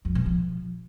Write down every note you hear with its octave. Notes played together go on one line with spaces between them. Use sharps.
F2
B2
F3